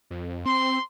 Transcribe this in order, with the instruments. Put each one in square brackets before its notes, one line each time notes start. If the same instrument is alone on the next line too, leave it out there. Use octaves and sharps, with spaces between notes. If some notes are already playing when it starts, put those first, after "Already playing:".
[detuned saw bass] F2
[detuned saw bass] C4 [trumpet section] C6